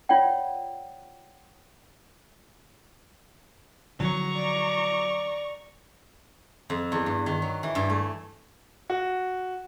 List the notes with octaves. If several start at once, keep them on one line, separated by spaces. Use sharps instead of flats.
F4 C#5 D5 F#5 G5
D3 F3 F#3 A#5 C#6
D5
F2
E2
G2
D#3
F#3
E3
G2
A3
F#4